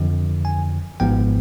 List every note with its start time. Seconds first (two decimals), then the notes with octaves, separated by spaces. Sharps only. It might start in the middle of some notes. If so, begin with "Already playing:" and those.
Already playing: F2 D3 F3
0.45 G#5
1.00 G#1 G#2 F3 G#3 B3 G5